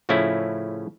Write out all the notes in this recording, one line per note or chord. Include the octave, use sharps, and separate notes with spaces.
A2 C#3 F3 A3 C#4 E4